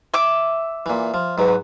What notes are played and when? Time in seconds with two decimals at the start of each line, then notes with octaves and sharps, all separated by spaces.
0.14 E5 D6
0.86 A#2 E3
1.14 F3
1.38 G#2 F#3 B4